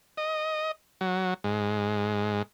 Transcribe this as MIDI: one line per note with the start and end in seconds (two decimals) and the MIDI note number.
0.17 0.71 75
1.01 1.34 54
1.44 2.42 44